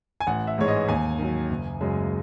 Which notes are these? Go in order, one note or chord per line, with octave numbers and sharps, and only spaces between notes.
G#5
A1 F#5
E5
G#2 E3 G#3 C#5
D#5
D#2 G#5
D#3 F#3
F#1
F#2 C#3 G#3